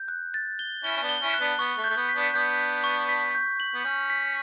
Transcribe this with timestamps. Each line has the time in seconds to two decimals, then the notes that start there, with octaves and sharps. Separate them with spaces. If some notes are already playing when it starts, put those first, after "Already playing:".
Already playing: G6
0.08 F#6
0.34 A6
0.59 G7
0.84 C#4 E4 G7
0.97 C#4
1.02 B3 D4
1.09 G7
1.21 C#4 E4
1.34 F#6
1.40 B3 D4
1.59 B3 C#6
1.78 A3
1.84 G6
1.90 A3
1.96 B3
2.09 B6
2.15 B3 D4
2.34 B3 D4 G6
2.59 G6
2.84 C#6
3.09 B6
3.35 G6
3.60 F#7
3.74 B3
3.85 C#4 G6
4.10 B6